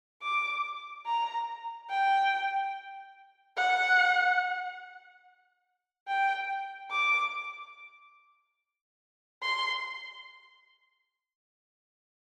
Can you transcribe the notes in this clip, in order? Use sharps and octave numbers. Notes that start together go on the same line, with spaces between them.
D6
A#5
G5
F#5
G5
D6
C6